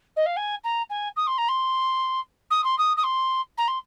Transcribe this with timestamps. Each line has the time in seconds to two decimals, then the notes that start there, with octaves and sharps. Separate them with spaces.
0.16 D#5
0.26 F5
0.36 G#5
0.63 A#5
0.89 G#5
1.16 D#6
1.27 C6
1.38 A#5
1.48 C6
2.50 D#6
2.64 C6
2.78 D#6
2.97 D#6
3.03 C6
3.57 A#5
3.67 C6